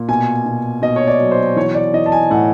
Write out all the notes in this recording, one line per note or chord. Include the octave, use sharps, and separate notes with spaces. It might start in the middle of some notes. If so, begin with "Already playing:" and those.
Already playing: A#2
B2 G#5
B2
B2 D#5
C#5
D5
F#3
C5
E3 C#5
D5
E3 D#5
A5
G#5
A2 F#5